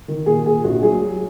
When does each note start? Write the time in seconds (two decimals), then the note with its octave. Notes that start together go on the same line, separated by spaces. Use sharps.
0.08 D#3
0.26 A#2 G#4
0.45 A#2 G#4
0.64 A#1 F#4
0.83 F#3 G#4
1.02 F#3